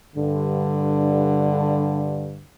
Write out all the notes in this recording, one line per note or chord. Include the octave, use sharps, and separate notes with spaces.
G2 D3